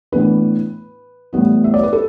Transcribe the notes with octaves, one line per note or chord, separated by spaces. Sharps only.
A2 E3 B3 D4 B4
A2 E3 G3 B3 E4
E5
D5
B4
A4